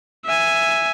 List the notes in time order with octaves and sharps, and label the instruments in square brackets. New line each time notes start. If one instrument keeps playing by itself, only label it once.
[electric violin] E5 G#5